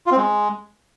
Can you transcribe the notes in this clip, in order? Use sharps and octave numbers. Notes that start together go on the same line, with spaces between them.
F4
C4
G#3